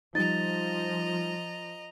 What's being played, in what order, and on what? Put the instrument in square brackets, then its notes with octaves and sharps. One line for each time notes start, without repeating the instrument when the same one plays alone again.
[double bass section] F3 [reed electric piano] G3 D#4 [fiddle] D#5 A#5 [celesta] A6